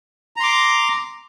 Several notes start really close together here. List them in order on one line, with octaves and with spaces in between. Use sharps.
A#5 C6 D6